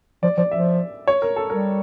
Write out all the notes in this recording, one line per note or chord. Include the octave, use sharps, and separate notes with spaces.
F3 D5
F3 D5
F3 E5
C#5
A#4
A4
G3 A#4